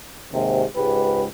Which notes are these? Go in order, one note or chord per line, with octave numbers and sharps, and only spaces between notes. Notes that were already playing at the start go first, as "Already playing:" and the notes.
D#2 G#2 C3
C#2 G#2 G4 B4